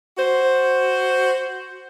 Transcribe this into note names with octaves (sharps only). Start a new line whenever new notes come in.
F#4 C5